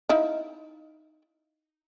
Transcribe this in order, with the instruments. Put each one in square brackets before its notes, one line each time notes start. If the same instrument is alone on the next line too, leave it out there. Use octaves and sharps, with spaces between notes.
[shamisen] D#4 E4 F5